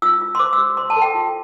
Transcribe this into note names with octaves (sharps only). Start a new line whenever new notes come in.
F4 E6
F4
C6
C5 D6
E6
G4
C5 C6
A5
A4
G5
F4